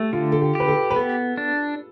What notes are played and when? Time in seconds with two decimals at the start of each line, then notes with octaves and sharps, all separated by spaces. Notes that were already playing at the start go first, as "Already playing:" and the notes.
Already playing: A3 G4 A4
0.13 D3 F4
0.32 A4
0.41 G4
0.55 G4 B4
0.68 A4
0.90 B4
0.96 B3 A4
1.37 D4